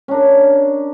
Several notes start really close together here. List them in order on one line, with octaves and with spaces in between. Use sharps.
C#4 D4 A#4